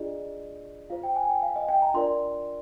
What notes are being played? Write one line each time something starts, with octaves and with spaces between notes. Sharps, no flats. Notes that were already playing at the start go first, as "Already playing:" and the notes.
Already playing: D4 F4 G#4 D5 D#5
F4 C5 F5
G5
G#5
G5
F5
D#5
G5
A#5
D4 F4 A#4 D5 C6